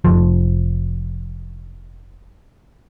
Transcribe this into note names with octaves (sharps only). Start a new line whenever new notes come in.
F1 A#1 F3